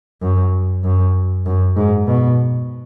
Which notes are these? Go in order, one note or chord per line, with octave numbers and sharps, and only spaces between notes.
F#2
F#2
F#2
G#2
B2